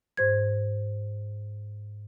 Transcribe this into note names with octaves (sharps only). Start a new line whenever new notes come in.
G#2 C5 G#6